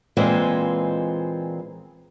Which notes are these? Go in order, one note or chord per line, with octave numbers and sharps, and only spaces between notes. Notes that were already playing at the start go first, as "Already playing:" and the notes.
A#2 E3 G#3 C4 F4 D#5